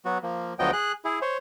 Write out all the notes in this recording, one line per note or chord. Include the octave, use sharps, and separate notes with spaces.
F#3 B3 F#4
F3 A#3
D2 F3 F#3 B3 D#5 G5
G#4 F#6
E4 G#4
C5 C#5